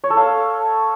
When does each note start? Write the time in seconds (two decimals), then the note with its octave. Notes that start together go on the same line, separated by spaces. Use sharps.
0.04 C#5
0.10 A4
0.17 F5